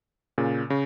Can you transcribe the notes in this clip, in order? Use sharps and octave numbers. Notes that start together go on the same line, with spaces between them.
A#2 C#3
C#3